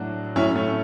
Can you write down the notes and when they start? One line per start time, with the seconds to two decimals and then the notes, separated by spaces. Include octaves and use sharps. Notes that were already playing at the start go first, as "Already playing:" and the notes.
Already playing: A2 F#3 D4 F#4
0.36 A2 F#3 C#4 E4
0.56 A3 C#4